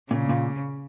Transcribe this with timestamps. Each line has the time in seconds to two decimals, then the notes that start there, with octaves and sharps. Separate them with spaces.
0.11 A#2 C#3
0.29 A#2